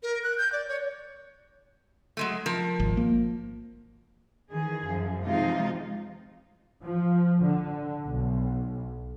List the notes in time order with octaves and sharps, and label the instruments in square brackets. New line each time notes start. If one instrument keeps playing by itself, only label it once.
[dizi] A#4
F#6
G6
D5
C#5
[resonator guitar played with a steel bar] F#3 G#3 A3
F3 A#4
[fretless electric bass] G#1
A#3
[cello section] D#3 E3 G#4
F#2 F3
C3 F3 G#3 D#4 F4
[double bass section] F3
D3
B1